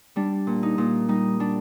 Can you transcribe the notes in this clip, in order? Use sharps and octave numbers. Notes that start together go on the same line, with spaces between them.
G3 D4
A#2
D#4
A#2
G3 D#4
G3 D4